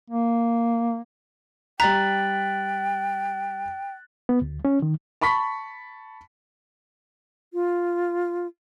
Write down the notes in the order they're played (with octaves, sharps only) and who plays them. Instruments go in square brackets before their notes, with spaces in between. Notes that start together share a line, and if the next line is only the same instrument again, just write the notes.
[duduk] A#3
[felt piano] G3 B6 [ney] G5 [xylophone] A#5 [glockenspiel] F#6 A6 F#7
[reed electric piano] B3
D2
C#4
D#3
[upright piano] A5 B5 C#6 B6
[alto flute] F4